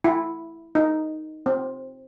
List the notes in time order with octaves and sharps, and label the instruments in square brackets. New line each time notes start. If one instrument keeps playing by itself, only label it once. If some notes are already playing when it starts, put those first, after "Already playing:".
[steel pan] E4
D#4
C4